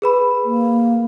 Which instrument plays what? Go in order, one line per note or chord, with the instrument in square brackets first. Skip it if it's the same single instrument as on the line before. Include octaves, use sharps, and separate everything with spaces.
[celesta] G#4 B4 B5
[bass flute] A#3